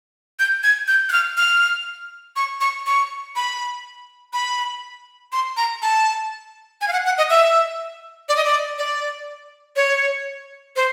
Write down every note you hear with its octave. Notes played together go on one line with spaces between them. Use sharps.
G6
G#6
G6
F#6
F6
F6
C#6
C#6
C#6
B5
B5
C6
A#5
A5
G#5
F5
F#5
F#5
D#5
E5
D5
D#5
D5
D5
C#5
C5